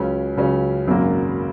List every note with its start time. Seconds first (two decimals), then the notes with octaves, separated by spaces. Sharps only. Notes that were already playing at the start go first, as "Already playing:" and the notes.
Already playing: C#2 C#3 F#3 C#4
0.37 C#2 C#3 F#3 C#4
0.87 G#1 F#2 C#3 A#3 F#4